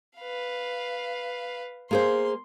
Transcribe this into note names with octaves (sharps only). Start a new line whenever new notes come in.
B4 F5
A#3 G#4 C5 C6